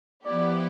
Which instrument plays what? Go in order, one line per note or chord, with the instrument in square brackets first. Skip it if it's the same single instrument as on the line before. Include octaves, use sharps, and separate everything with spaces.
[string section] F3 B3 E4 G4 [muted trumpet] D5